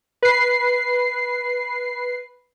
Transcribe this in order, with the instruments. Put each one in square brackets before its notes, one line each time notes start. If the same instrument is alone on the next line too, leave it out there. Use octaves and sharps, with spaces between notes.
[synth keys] B4 C7